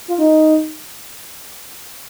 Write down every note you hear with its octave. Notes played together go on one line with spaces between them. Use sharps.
F4
D#4